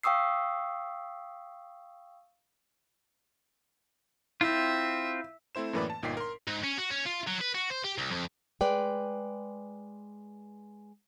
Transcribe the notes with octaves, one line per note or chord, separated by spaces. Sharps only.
F5 G5 C#6 D#6 E6 C7
C4 E4 F4 E5
A3 C4 E4 C5 E7
F#2 A2 E3 A#3 B4 D5
A5
G1 A#2 D#4 G5 B6 C7
A#4 C6
G#2
C#4
F#4
C#4
F4
F#3
B4
F#4
C5
G4
C2
F2
G#3 B4 D5 G5